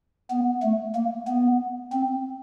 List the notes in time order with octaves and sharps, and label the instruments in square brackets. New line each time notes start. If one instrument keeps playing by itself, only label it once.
[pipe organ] B3
A3
A#3
B3
C4